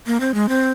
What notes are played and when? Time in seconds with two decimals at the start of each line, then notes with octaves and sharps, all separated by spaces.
0.06 A#3
0.20 C4
0.34 G#3
0.49 C4